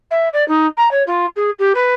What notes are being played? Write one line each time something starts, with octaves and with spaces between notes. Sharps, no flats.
E5
D5
D#4
A#5
C#5
F4
G#4
G4
B4